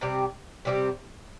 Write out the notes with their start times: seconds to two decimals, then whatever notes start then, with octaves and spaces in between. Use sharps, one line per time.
0.01 C3 G3 C4 G4
0.65 C3 G3 C4 G4